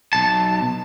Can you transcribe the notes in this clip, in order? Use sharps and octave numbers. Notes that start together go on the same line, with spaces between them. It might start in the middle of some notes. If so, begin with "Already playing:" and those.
B1 A5